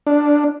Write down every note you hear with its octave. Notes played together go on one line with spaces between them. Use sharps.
D4